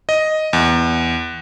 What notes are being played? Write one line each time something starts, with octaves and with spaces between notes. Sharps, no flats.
D#5
E2